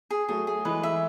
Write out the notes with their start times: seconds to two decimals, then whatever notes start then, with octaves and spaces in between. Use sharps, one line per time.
0.11 G#4
0.28 F#3 A3 G#4
0.47 G#4
0.65 E3 G#3 B4
0.83 E5